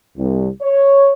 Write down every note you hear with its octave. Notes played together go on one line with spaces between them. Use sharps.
C2
C#5